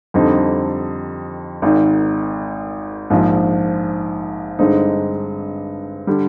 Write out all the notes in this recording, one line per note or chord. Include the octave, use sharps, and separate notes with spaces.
F2 D3 G3 C4 D#4
G#1 G#2 D#3
A#1 G#2 F3
G2 D3 G#3 C4 D#4
D3 G3